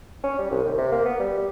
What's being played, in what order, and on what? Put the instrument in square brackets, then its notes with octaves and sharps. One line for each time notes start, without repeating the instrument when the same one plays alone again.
[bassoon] C#4
G3
C2
D#2
C3
A#3
B3
G3
G3